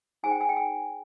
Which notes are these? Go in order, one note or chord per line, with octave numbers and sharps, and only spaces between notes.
D#4 G#4 C5 G#5
G5
G#5
G5
G#5